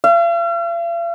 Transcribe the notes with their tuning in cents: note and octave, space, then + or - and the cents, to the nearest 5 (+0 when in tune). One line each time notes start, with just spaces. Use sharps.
F5 -45